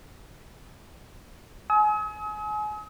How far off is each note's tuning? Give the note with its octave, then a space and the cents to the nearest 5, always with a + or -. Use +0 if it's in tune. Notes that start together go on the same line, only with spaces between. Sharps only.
G#5 +30 D#6 +45